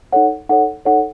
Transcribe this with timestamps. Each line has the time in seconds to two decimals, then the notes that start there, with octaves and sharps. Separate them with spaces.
0.12 D#4 A4 C#5 F#5
0.49 D#4 A4 C#5 F#5
0.85 D#4 A4 C#5 F#5